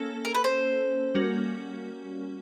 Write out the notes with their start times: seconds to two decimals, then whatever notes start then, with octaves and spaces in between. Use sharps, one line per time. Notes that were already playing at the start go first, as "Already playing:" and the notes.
Already playing: A#3 C#4 A4
0.25 A#4
0.35 B4
0.44 C5
1.15 G3 A#3 C#4 F#4 A#4